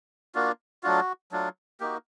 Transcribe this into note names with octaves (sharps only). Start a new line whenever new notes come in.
A#3 D4 F4 F#4
F#3 A3 D4 F4 F#4
F#3 A3 D4 F4
A#3 D#4 F#4 G4